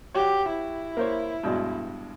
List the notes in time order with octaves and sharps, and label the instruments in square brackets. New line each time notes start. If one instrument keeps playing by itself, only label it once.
[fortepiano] F#4 C#5 [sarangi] G4
[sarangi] E4
[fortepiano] A#3 C5 C#5
G2 B2 G#3